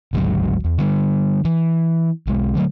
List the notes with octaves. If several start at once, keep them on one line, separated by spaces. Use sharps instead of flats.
G#1 D2 G#2 F#3
E2
D3 D#3 G3
E3
B1 G#3
D3 F#3 G#3 A3